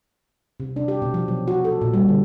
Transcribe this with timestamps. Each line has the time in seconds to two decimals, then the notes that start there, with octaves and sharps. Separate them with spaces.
0.60 C3
0.76 D4
0.88 G4
1.02 B2
1.14 F3
1.28 F#3
1.48 F#4
1.65 A4
1.81 A#2
1.94 G3
2.09 D3